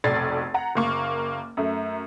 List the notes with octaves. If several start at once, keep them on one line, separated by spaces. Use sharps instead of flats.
F1 B1 D5 G#6 A6 C7
F#5 A#5
F#1 A#3 C#6
F#2 A3